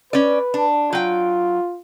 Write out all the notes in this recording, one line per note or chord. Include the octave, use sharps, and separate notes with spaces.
C#4 B4 D5
D4
F#3 F4 G5